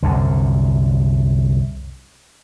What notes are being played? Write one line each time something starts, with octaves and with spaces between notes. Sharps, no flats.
C2 F#2 D3